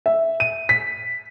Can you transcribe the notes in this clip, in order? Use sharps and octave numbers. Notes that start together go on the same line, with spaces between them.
E5
D#7
B6